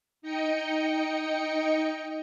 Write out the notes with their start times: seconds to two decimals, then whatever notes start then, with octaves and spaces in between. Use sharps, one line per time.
0.22 D#4 D#5 G5 C#7